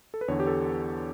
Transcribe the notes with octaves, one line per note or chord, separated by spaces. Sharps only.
A4
B4
E2 D3 C#5
G4
A4